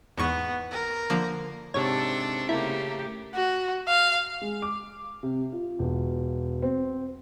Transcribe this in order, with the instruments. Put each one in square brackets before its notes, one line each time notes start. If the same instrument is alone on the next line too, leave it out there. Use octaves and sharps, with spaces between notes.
[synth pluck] E2 G#2 C#6 [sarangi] B3
[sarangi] A#4
[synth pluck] D3 F3 A#3
[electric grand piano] G#2 C3 [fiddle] D4 A4 [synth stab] C#5
[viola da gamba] C#3 A3 G4 [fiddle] A#3 [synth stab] E4
[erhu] F#4
F5
[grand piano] G#3
D6
C3
F4
E1
C4